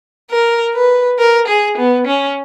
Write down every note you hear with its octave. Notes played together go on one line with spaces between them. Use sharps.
A#4
B4
A#4
G#4
B3
C#4